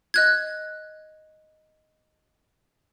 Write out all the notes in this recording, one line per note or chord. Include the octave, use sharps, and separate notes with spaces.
D#5 F#6 G#6